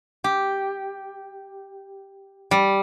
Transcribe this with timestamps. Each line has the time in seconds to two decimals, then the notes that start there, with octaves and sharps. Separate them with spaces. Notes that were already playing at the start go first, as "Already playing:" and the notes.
0.24 G4
2.51 G3